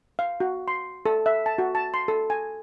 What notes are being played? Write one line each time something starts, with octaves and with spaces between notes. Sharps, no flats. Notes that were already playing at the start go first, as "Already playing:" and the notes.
F5
F#4
C6
A4
E5
A5
F#4
A5
C6
A4
G#5